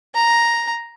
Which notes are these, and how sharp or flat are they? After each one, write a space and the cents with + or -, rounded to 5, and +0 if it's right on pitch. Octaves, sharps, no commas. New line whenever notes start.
A#5 +5